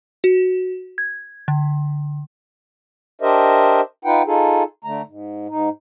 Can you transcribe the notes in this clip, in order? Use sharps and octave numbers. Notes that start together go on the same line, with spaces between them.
F#4
G#6
D3
D4 G4 A#4 C5 D#5 E5
D#4 F4 B4 F#5 G5
D#4 F4 G#4 A4
D3 A3 A#5
G#2
G#2 D#4